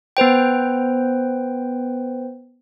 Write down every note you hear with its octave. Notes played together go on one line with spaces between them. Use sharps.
B3 B4 C5 G5